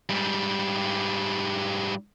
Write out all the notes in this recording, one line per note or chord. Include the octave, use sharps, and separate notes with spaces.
G#2 G3